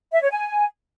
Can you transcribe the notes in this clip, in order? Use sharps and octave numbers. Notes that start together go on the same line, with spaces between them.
E5
C#5
G#5